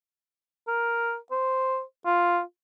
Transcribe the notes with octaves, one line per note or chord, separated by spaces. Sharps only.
A#4
C5
F4